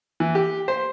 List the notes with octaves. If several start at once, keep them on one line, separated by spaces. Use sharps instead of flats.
E3
G4
C5